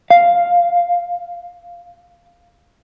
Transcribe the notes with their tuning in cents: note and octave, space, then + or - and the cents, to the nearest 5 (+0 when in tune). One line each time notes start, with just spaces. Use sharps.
F5 +0